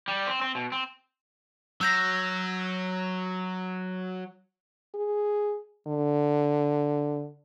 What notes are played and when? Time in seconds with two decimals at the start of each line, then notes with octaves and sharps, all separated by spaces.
0.08 G3
0.27 C4
0.41 C4
0.55 B2
0.72 C4
1.81 F#3 E6 G6 A#6
4.95 G#4
5.87 D3